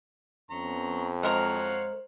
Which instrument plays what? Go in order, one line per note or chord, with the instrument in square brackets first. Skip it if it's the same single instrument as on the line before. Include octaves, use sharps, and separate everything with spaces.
[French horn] F2 [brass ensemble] B3 C#4 [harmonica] A#5 C#6
[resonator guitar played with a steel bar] G#3 A#4 A#5 [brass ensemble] C5 [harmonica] C#5 F5 F#5